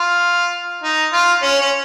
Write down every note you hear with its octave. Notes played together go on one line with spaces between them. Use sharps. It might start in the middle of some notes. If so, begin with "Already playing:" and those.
Already playing: F4
D#4
F4
C#4
C#4